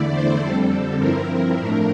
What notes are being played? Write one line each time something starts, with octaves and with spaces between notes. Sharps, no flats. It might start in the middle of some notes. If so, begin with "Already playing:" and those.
Already playing: E2 D3 A3 E4 D5
C5
F2 D3 G3 C4 A4
A4
G2 F3 C4 E4 A#4
A#4
A2 F3 A3 D4 A#4